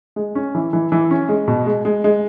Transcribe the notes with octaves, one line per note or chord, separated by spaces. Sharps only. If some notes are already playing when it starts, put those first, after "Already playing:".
G#3
C#4
E3
E3
E3
C#4
G#3
B2
G#3
G#3
G#3